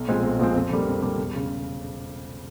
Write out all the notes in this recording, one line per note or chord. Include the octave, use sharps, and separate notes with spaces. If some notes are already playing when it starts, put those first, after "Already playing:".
Already playing: B1
A#2 F3 G#3 C4
B1
A#2 F3 G#3 C4
F2
D3 G3 A#3
F2
D3 G3 A#3
E1
C#3